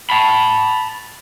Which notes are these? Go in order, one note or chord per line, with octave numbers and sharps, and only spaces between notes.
A5 B5